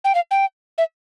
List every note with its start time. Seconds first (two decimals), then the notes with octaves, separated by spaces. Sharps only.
0.05 G5
0.15 F5
0.31 G5
0.78 E5